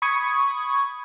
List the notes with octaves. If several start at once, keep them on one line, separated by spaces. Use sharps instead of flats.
B5 C#6 D#6 G#6